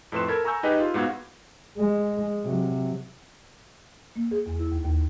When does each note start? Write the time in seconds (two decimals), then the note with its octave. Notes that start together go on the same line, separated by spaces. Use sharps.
0.12 F2 A2 B4 C6 E7
0.28 A4 A#4 B5 G#6
0.44 G#5 A#5 C#6 E6 G6
0.63 D#4 G4 G#4 B4 D#5
0.80 F4
0.94 G#2 B3 F#4 F5 G#6
1.78 G#3
2.44 C3 F#3
4.16 A#3
4.31 G#4
4.46 E2
4.59 E4
4.72 D#2
4.85 D#2